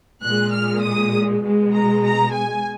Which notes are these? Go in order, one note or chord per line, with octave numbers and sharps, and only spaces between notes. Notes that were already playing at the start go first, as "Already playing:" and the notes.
A#2 G#3 F#6
F6
D#6
B2 G#3
A#5
A#5
G#5